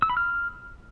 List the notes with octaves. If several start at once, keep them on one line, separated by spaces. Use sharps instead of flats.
E6
B5
F6